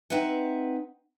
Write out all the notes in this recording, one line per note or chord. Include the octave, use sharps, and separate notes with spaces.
C4 D#4 B4 E5 F#5